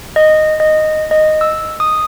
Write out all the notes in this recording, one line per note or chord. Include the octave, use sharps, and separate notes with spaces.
D#5
D#5
D#5
E6
D#6